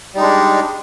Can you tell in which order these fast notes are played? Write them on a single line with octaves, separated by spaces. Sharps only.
G3 D#4 G#3 D4